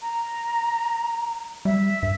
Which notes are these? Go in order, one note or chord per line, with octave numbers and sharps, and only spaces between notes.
A#5
G3 E5
G2